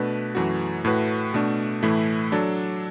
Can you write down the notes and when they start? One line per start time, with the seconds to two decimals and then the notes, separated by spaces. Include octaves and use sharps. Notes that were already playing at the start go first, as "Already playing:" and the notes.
Already playing: B2 A3 D4 B4
0.35 F#2 E3 A3 F#4
0.85 A2 A3 F#4 B4
1.34 B2 A3 D4
1.83 A2 E3 A3 E4
2.32 F#3 D4 A4